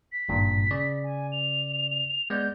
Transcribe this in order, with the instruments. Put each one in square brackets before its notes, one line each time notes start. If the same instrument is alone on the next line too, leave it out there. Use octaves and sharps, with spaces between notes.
[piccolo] B6
[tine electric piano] G#1 G2 A#2
C#3 D5
[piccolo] G#5
F7
[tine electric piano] G#3 B3 D5 [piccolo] G6